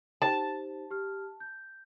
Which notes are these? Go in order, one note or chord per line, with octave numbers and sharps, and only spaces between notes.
D#4 G4 C5 A5
G4 F6
G6